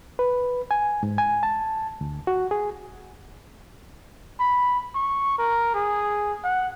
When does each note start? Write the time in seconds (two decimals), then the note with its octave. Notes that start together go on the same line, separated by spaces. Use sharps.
0.19 B4
0.71 G#5
1.03 G#2
1.18 G#5
1.43 A5
2.01 D2
2.27 F#4
2.51 G#4
4.40 B5
4.95 C#6
5.38 A#4
5.75 G#4
6.44 F#5